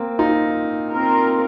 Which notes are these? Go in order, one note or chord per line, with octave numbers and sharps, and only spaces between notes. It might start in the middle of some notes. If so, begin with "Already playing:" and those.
Already playing: A#3 C4
D#4 F4
C4 F4 A#4